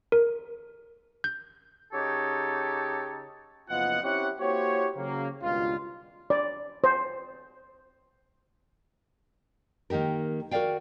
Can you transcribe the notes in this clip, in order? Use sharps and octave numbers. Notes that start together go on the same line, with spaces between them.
A#4
G6
C#3 D#4 G4 A4 C#5
F#1 F3 B3 F4 D#5 F#5
C4 C#4 E4 G4 C#5 F#5
A#3 E4 F#4 G4 C5 C#5
C#3 F#3 A#3
C#2 G2 B2 D#3 F4
D5
C5
D#3 A#3 D#4 G4 A#4
F#4 A#4 B4 D5 F5 G5